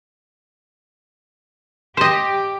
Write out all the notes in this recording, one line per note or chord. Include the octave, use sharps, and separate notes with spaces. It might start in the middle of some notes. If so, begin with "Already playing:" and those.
G4 C5 D#5